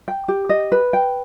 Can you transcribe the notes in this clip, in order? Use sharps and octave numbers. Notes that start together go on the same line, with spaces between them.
G5
G4
D#5
B4
G5